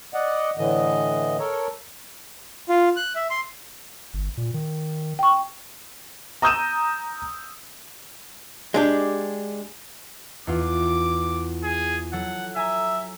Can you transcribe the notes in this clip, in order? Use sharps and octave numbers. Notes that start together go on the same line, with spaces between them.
D5 D#5 F#5
A2 D3 E3 D#5
A4 A#4 C#5
F4
F#6
E5
C6
G1
A#2
D#3
G5 C#6
A#5 D#6 E6 G6 D#7 E7
G#3 D4 G4
E2 F4 D6
G#4
F#3 A4 F#5
E5 G#5 A#5